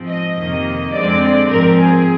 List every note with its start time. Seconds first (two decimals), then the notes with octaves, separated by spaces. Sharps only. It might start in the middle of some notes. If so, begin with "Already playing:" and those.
Already playing: G#2 F3 C4
0.09 D#5
0.38 F2 C3 D#3 A#3
0.94 F2 D3 G#3 C4 D5
1.51 G#2 F3 C4 A#4
1.79 G#4